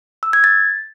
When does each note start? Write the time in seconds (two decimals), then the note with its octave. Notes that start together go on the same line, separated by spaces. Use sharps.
0.23 E6
0.33 G#6
0.44 A6